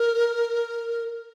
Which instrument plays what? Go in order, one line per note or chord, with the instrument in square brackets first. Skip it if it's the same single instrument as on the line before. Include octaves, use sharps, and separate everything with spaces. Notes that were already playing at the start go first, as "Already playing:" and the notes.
Already playing: [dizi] A#4